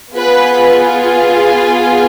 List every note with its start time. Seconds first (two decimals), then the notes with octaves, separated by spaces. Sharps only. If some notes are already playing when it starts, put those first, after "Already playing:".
0.15 B3 F4 G#4 B4